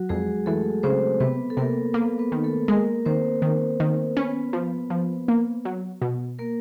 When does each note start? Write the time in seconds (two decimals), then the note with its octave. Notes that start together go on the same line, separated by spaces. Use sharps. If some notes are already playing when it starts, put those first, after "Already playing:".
Already playing: F#3 F#4
0.09 F2 G#3 G#4
0.46 E3 A3 A4
0.83 C#3 C4 C5
1.20 C3 B3 B4
1.50 A4
1.57 C3 A#3 A#4
1.94 A#3 B3 B4
2.19 B3 B4
2.32 D#3
2.43 A3 A4
2.68 G#3 A#3 A#4
3.05 D#3 C4 C5
3.42 D#3
3.80 D#3
4.17 B3 C#4 B4
4.53 F3
4.90 F3
5.28 A#3
5.65 F#3
6.02 B2
6.39 A#3 A#4